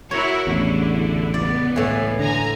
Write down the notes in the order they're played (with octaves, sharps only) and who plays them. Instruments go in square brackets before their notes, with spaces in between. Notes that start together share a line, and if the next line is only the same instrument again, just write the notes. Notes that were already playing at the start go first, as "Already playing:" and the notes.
[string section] E4 F#4 A#4 [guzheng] C#5
[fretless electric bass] A1 E2 [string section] D3 E4
[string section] C#2 B3 [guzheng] D5
[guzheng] A2 E3
[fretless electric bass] D3 [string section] G#5 A#5